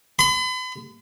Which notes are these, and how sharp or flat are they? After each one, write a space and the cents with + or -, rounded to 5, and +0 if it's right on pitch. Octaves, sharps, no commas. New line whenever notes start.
B5 +40